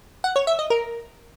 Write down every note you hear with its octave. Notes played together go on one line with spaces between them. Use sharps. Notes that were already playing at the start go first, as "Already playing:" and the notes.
F#5
C#5
E5
D#5
A#4